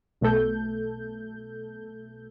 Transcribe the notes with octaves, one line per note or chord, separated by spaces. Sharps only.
B1 B2 A3 A4 G6